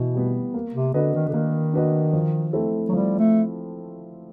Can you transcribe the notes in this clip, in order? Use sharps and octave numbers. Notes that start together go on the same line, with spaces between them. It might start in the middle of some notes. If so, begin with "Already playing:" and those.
Already playing: B2 E3 B3
G3 B3
A#3
C3
D3 D4 F#4 B4 D#5
D#3
D3
D#3 A#3
D4 F#4 B4 D#5
F3
A3 C4 E4 A4
F#3
F3 G3
A3